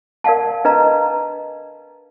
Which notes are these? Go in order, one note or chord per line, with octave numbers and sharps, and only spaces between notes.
A#4 D5 F5 F#5 A5
D4 B4 D#5 F5 A#5